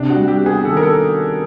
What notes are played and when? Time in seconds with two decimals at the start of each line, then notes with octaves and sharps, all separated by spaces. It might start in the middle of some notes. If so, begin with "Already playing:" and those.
Already playing: C3 D4
0.10 F#4
0.16 G3
0.28 G4
0.41 B3
0.46 G#4
0.65 D#3 A4
0.77 A#4
0.83 A4